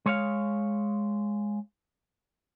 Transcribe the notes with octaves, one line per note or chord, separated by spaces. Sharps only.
G#3 C#5 F5